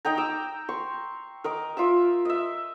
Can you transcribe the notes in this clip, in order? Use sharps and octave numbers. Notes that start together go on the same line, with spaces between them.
D#4 D#5 G5 A#5
D6 E6
C6 C#6
A#4 D#5 D6
F4 E5 E6
D#5 E5